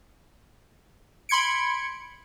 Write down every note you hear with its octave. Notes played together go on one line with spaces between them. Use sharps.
B5 C6 G#6 C#7 D7